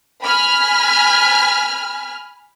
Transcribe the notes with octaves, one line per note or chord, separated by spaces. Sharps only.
G#5 B5 F6